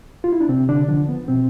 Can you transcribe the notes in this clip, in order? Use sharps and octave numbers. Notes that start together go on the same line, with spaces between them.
F4
E4
D4
C3 C4
D3 D4
D3 F3 D4
B3
B2 C4